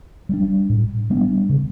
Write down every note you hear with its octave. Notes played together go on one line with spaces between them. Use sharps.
G3 B3 D4
A2
G3 B3 D4
C#3